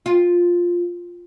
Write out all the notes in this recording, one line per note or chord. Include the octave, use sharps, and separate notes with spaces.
F4